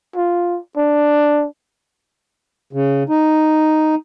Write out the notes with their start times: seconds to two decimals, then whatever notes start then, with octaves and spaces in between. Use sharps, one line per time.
0.16 F4
0.76 D4
2.73 C#3
3.09 D#4